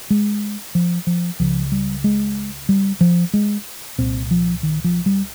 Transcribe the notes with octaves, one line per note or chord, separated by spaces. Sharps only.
G#3
F3
F3
C#2 C#3 F3
G3
G#3
G3
F3
G#3
C2 A#2 C4
F3
D#3
F3
G3